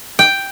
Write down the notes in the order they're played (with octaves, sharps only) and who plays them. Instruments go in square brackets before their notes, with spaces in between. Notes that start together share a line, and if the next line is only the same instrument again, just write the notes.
[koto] G5